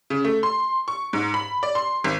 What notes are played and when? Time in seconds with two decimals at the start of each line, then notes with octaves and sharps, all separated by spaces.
0.10 C#3
0.24 A3
0.43 C6
0.88 C#6
1.13 G#2
1.34 B5
1.63 D5
1.75 C6
2.04 G#1